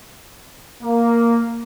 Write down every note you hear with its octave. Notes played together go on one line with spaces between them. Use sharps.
A#3